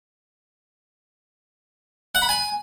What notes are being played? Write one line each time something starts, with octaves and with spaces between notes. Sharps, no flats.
F#5
B5
G#5